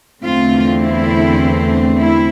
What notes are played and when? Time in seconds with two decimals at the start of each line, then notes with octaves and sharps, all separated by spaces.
0.22 E2 D3 A3 C4 F4
0.81 E4
1.99 E4